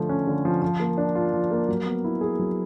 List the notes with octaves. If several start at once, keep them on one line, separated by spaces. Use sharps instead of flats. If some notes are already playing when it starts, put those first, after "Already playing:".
Already playing: D3 F3 A3
C#4
D3
F3
F3
A#3
D4
F4
F3
A#3
F#3
B3
E4
G#4
F#3